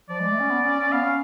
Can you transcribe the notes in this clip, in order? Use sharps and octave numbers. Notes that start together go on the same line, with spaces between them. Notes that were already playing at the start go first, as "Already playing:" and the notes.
F3 D5
G#3
A3
C#4
B3
C#4
C#4
B3 F5
C#4